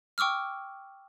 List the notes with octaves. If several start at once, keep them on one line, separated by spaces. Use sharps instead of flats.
G5 C#6 D6 E6 F6